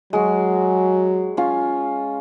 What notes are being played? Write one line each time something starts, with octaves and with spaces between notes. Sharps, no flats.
F#3 G#3 F#4
C#4 F4